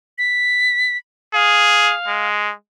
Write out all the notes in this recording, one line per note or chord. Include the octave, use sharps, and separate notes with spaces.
B6
G#4 F5
G#3